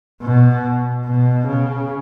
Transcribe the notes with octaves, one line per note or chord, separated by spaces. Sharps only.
B2
B2
C#3